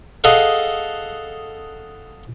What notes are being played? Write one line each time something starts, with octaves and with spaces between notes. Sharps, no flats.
G#4 A4 D#5 F5 F#5